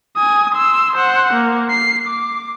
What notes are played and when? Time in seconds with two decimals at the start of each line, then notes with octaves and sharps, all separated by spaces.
0.17 G#5 D#6
0.55 C6 E6
0.96 C5 F#5
1.34 A#3
1.70 C7
2.08 D6